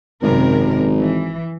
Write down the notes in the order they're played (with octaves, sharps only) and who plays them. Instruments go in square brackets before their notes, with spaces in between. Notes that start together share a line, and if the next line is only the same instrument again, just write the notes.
[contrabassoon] G#1 [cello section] F#2 C3 A#4
[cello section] E3